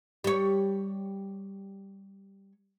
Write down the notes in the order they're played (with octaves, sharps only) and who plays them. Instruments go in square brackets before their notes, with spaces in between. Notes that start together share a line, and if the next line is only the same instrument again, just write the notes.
[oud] G3 C#5